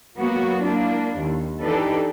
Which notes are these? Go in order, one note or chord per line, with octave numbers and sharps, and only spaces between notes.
F#3 A#3 B3 F#4
A#3 D4 E4
D#2
E3 D4 D#4 G4 A4 B4